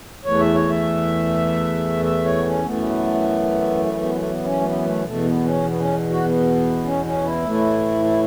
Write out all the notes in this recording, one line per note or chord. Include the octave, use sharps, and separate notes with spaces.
E2 E3 A3 C#5
E5
C#5
E5
E5
C#5
B3
C#4
F#2 E3 A3 B3
B3
B3
A3
B3
C#4
A3
B3
A3
E2 B2 A3
B3
C#4
B3
C#4
F#4
B3
C#4
C#4
E4
A2 E3 A3
E4